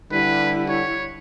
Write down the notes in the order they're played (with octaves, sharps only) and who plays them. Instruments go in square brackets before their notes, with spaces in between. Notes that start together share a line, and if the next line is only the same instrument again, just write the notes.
[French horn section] D3 G3 [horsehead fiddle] E4 [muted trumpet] B4
[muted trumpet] C#5